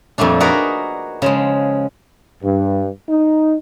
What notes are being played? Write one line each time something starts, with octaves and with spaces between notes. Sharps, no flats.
F2 A#2 G3 A3 D4
D#4 F#4 G#4 A#4 B4 D5
C#3 F3 G#3
G2
D#4